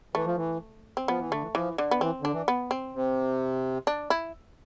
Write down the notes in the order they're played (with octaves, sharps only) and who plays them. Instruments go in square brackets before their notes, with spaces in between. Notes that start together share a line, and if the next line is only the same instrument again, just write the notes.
[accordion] E3 [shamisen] A3
[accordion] F3
E3
[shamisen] C4
[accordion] F3 [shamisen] B3
[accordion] E3
[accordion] D3 [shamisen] A3
[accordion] E3
[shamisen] E3 [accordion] F3
[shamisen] D3
B3
[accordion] E3 [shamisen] C4
[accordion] D3 [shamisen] D4
[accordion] E3
[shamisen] B3
C4
[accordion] C3
[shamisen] D4
E4